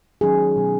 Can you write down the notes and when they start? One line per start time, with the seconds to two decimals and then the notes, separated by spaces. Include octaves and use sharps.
0.21 D#3 F#3 C#4 G#4
0.56 B2 F#3 B3